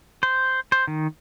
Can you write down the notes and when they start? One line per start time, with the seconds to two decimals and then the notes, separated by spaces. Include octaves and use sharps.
0.23 C5
0.72 C5
0.87 D#3